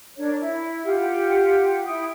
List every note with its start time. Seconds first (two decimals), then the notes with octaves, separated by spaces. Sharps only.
0.17 D4 A#4 C#5
0.40 E4
0.85 F4 G4 F#5
1.86 E4 G5 D#6